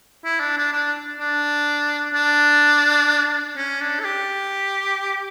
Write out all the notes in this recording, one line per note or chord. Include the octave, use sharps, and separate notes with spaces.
E4
D4
D4
D4
D4
D4
C#4
D4
A4
G4